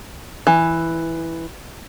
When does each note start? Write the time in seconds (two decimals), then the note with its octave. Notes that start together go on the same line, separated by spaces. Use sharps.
0.47 E3